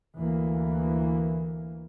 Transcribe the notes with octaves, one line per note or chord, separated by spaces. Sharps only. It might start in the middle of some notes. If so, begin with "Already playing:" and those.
D2 E3 A#3